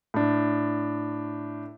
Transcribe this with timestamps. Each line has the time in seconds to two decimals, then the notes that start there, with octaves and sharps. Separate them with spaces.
0.14 A2 D4